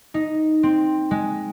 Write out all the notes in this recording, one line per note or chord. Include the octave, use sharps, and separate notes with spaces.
D#4
C4
G#3